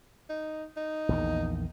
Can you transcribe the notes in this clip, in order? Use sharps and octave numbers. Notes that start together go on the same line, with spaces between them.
D#4
D#4
A#1 E2 D#3